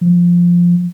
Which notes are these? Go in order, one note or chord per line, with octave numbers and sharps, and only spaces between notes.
F3